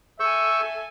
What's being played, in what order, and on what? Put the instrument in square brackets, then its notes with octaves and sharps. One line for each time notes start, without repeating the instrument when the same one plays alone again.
[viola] A4 G#5 [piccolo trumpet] E5 [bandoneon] C#6 E6 G6